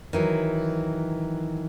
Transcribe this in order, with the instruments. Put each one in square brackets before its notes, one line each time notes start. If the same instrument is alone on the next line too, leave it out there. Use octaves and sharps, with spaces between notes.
[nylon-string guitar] D#3 E3 F#3